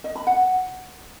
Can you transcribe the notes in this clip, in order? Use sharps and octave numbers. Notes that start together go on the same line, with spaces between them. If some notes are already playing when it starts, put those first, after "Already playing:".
D#5
B5
F#5